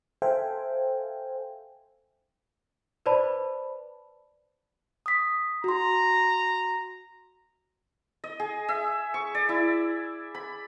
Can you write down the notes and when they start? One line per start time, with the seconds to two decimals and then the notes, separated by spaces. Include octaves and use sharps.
0.22 A4 C5 E5 F5 G5 G#5
3.06 B4 C5 D5 A5 B5
5.06 D#6 B6
5.64 F#4 A#5 C6
8.24 D#5
8.40 G#4
8.69 E5
9.14 C#6
9.35 D5
9.49 E4
10.35 B5